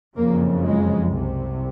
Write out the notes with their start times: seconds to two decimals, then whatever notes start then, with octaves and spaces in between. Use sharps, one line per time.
0.16 F#1 F2 C#3 A#3
0.64 G#3
1.13 C2 C3